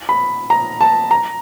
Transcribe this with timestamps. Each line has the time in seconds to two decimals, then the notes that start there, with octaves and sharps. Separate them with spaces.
0.09 B5
0.50 A#5
0.81 A5
1.11 A#5